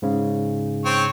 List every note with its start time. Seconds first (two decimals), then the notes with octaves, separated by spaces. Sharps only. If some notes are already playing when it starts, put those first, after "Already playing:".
0.02 G#2 C#3
0.85 C4 C#5